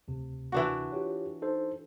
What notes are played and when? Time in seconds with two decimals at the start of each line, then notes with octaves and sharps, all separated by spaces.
0.08 D2 C3
0.52 E3 D4 F#4
0.92 F4 G4 C#5
1.42 D#4 A4 C5